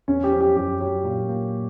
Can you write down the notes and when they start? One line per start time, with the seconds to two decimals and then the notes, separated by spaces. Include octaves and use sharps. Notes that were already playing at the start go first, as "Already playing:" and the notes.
0.08 E2 C#4
0.24 G4
0.32 F3
0.41 G4
0.56 F#2 G4
0.80 F#3 G4
1.05 A#2
1.29 A#3